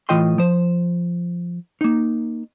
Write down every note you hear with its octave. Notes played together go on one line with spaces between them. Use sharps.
A2 E3 F4 D#5 G5 C6
F3 C5
A#3 D#4